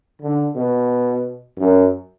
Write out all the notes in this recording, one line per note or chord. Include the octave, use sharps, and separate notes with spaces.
D3
B2
F#2